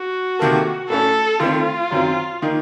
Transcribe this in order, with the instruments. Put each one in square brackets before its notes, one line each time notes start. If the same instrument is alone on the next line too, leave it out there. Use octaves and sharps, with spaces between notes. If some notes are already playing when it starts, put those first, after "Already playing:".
Already playing: [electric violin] F#4
[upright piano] C3 D#3 A#3 F4 A4
[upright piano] A2 A3 C#4 [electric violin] A4
[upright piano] D#3 A3 C4 [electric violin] F4
[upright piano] F#2 D#3 F#3 C4
D#3 A#3 D#4